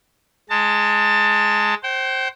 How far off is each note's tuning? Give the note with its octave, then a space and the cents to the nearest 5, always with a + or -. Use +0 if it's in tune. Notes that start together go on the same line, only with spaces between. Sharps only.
G#3 +5 A5 +25
C5 +20 G5 -35